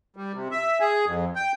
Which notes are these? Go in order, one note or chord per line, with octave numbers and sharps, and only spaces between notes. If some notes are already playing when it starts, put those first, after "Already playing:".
G3
C3
E5
G#4
F2
G5